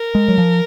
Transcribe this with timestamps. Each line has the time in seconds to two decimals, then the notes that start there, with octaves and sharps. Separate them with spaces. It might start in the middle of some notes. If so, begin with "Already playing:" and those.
Already playing: A#4
0.15 G#3
0.28 F#3
0.38 F3